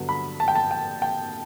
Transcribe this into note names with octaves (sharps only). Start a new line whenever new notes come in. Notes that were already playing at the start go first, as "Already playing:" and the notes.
Already playing: G2 D3 F#3 B3
B5
A5
G5
A5
G5
G5